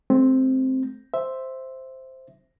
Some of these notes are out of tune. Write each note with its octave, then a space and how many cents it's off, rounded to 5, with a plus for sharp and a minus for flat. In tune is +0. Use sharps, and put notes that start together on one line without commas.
A3 -45 C4 +0
C5 +0 E5 +0